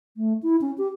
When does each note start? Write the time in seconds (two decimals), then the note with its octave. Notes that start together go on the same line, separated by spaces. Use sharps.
0.17 A3
0.43 E4
0.61 C#4
0.78 G4